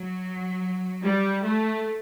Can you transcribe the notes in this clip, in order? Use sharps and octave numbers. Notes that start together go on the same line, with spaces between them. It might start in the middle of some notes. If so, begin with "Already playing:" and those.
Already playing: F#3
G3
A3